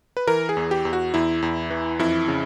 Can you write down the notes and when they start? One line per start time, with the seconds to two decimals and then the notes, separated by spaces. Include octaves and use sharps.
0.17 B4
0.27 E3 A#4
0.49 G#4
0.57 E2
0.71 G4
0.85 E2
0.93 F#4
1.14 E2 E4
1.42 E2
1.70 E3
1.99 F2 E4
2.28 C#3